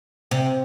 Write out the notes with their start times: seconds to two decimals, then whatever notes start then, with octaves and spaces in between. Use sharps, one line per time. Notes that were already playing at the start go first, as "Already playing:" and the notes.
0.31 C3